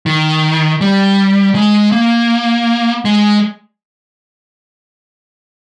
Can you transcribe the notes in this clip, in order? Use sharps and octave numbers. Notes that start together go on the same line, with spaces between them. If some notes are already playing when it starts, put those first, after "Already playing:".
D#3
G3
G#3
A#3
G#3